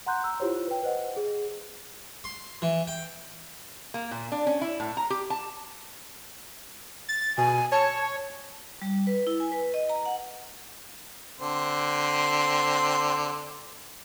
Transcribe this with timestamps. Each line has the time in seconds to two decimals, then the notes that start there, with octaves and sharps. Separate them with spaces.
0.06 F#5 A#5 C6 F#6 G6
0.24 A#5 E6
0.40 E4 F4 G4 C5 C#5
0.68 B4 G5
0.83 B4 C5 D#5 F#5
1.17 G#4
2.24 C6
2.62 E3
2.87 G5
3.94 A#3
4.11 A#2
4.32 D4
4.47 C#4
4.61 E4
4.80 A2
4.97 A#5
5.10 G4
5.30 A5
7.09 A6
7.38 B2 G#5
7.72 C#5 A5
8.82 G3
9.07 B4
9.27 E4
9.40 G#5
9.52 B4
9.74 D#5
9.90 A#5
10.06 F#5
11.41 D3 C4 C6